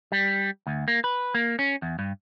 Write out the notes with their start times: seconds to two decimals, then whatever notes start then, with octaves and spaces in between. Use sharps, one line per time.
0.12 G3
0.67 D2
0.88 A#3
1.04 B4
1.35 A#3
1.59 C#4
1.82 E2
1.99 G2